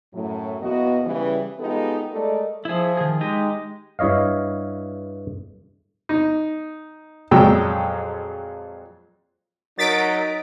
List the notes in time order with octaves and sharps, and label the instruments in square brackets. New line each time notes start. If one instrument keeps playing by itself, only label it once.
[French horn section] F#2 A2 F#3
E2 B2 A#3 B3 F#4 D#5
C#3 E3 G3
G#3 B3 D#4 F4 G4 A4
G#3 A3 A4 A#4 D5 D#5
[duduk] F3 [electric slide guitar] E4 G#4
[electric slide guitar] D#3 G#4
[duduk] G#3 [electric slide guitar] D#4 G4 D#5
[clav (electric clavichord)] G2 E4 C#5 D#5 F5
[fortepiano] D#4
F2 A#2 F#3 G#3 G5 E6
[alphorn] F#3 [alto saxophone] D#4 [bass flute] A#4 [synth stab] A6 B6 D7